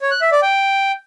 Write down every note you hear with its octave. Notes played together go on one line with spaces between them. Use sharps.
C#5
F#6
E5
D5
G5